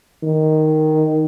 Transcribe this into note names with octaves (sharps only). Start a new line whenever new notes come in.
D#3